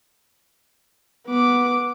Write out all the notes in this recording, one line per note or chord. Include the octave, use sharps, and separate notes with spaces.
B3 D6